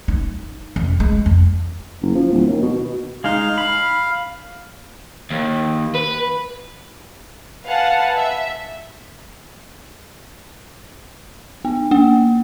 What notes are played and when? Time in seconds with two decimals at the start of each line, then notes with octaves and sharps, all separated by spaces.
0.08 D#4
0.76 F2
1.00 G#3
1.26 F2
2.02 F#1
2.15 F3
2.32 D1
2.46 D#2
2.62 B2
3.24 G#3 D#4 F5
3.58 B5
5.31 D#2
5.95 B4
7.64 B4 F5 F#5 G#5 A5
8.16 E5
11.65 B3
11.91 A#3